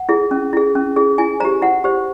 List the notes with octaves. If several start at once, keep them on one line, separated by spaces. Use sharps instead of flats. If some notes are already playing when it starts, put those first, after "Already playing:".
Already playing: F#5
E4 G#4
C#4
E4 G#4
C#4
E4 G#4
E4 G#5
G4 C5 A#5
E4 F#5
G4 C5